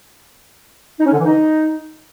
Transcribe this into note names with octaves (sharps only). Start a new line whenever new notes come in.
D#4
C#4
D3
E3
D#4